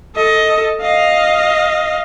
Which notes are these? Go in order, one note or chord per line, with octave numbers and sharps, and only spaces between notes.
A4 D#5
D#5 F5